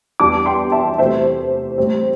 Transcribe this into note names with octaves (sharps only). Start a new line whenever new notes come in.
E2 E3 G3 D4 A5 D6
G5 C6
E5 A5
C3 E3 A3 C5 E5
A2 G3 C4